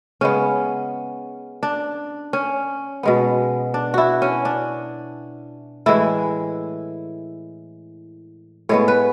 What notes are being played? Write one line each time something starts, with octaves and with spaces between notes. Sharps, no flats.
C#3 G#3 B3 C#4
D4
C#4
B2 G#3 B3
D4
E4 F#4
C#4
D4
A2 E3 G#3 E4
A2 G#3 B3 C#5
B4